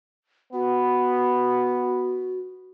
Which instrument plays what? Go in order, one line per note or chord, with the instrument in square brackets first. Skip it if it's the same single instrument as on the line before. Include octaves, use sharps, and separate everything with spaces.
[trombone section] B3 [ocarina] F#4